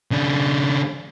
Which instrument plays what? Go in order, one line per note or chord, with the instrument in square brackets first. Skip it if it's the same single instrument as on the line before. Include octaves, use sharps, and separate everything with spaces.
[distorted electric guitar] C#3 D4